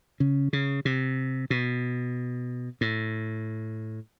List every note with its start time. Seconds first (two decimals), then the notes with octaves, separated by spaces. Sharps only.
0.20 C#3
0.53 C#3
0.85 C3
1.50 B2
2.81 A2